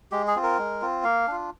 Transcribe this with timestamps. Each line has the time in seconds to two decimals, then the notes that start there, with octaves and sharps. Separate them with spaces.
0.12 G#3 G4
0.27 G#4
0.36 C4 F4
0.43 A#4
0.59 G#3
0.81 C4 F4
1.04 A#3 F5
1.27 D4 F4